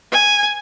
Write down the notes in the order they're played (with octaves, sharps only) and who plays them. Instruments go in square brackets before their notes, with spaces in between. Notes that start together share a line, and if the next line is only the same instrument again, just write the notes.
[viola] G#5